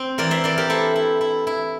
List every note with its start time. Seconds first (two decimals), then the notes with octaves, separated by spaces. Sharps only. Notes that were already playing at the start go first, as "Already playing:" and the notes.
Already playing: C4 C5
0.18 E3 A#4 D5
0.31 C5 E5
0.44 E3 A#4 D5
0.58 G4 A#4
0.70 E4 A4 C5
0.96 E4
1.21 E4
1.47 E4